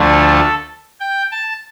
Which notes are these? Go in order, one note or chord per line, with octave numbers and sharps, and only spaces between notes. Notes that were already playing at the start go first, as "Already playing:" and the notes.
Already playing: D2 D3 F3 A3
A4
G5
A5